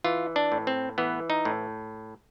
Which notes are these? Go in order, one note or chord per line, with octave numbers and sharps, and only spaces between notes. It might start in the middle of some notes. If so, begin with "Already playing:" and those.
E3 F4
D4
A2
C4
E3 B3
D#4
A2